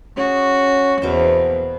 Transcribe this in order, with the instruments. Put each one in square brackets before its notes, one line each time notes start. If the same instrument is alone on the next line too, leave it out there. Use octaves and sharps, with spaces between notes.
[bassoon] C#4 [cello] F#4 [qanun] G#4
[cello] E2 [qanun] B2 A#3 C5